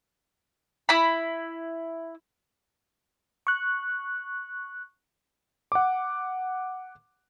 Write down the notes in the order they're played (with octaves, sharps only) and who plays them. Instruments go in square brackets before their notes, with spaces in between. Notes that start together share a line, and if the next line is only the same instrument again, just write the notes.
[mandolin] E4 B5
[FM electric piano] C#6 F#6
[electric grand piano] F#5 D6